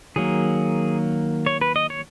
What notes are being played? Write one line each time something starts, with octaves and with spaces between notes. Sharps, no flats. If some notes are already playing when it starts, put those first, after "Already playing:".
D#3 F#3 A#3 G#4
C#5
B4
D#5
C#5